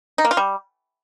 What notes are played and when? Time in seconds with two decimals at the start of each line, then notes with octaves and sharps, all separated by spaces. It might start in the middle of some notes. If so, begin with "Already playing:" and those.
0.18 D#4
0.25 A#3
0.31 F4
0.37 G3